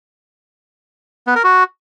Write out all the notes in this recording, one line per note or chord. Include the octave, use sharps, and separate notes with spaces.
B3
A#4
F#4